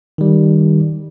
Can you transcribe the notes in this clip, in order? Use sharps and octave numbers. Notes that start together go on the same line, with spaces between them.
D#3 G3